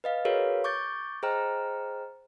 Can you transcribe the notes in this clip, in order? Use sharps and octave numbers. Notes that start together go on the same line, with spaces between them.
B4 D#5 F5
F#4 G#4 A#4 B4 C#5 F5
C#6 D6 G6 A6
G#4 C5 D#5 G5 A#5 F6